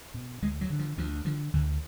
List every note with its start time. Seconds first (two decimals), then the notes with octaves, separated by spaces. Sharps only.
0.14 B2
0.42 D2 G#3
0.61 F#3
0.70 D3
0.79 F3
0.98 D2 F3
1.25 D3 F3
1.53 D2 D3